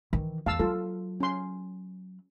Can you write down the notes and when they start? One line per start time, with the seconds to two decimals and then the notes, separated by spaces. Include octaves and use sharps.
0.13 D#3 E3
0.46 E2 F5 A5 E6
0.59 F#3 F4 A4
1.20 C#4 C6